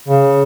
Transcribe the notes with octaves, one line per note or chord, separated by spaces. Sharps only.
C#3